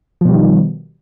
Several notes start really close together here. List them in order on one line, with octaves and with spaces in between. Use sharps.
F3 B2 G3 D#3